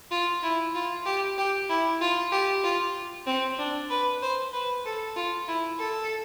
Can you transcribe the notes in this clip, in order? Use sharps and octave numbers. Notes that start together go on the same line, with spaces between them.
F4
E4
F4
G4
G4
E4
F4
G4
F4
C4
D4
B4
C5
B4
A4
F4
E4
A4